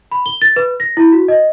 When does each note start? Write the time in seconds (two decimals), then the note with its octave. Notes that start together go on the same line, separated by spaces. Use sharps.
0.11 B5
0.26 G7
0.42 A6
0.56 B4
0.80 A#6
0.97 E4
1.12 F#4
1.28 D#5